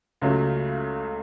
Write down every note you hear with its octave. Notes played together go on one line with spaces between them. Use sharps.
C#2 C#3 F#3 A3